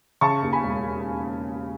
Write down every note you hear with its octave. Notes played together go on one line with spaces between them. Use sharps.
C#3 A5 C#6
D#2
G#5 B5
E1